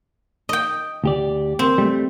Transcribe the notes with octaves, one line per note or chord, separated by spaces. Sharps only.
D#5 G5
D2 G4 D5
C4
G3 A3